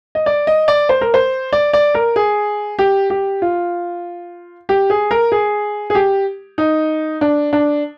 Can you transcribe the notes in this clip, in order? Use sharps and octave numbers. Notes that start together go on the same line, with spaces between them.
D#5
D5
D#5
D5
C5
A#4
C5
D5
D5
A#4
G#4
G4
G4
F4
G4
G#4
A#4
G#4
G#4
G4
D#4
D4
D4